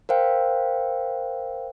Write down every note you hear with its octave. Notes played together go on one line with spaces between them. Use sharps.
A#4 C5 F5 G5